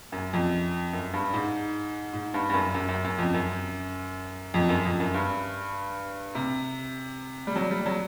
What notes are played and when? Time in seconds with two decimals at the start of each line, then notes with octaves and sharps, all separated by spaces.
0.12 F#2
0.33 F2
0.93 F#2
1.14 G2
1.34 G#2
2.13 G#2
2.34 G2
2.50 G2
2.54 F#2
2.75 F#2
2.89 F#2
3.04 F#2
3.19 F2
3.34 F#2
4.54 F2
4.69 F#2
4.85 F2
5.00 F#2
5.14 G2
6.35 C3
7.47 G3
7.56 F#3
7.71 G3
7.86 F#3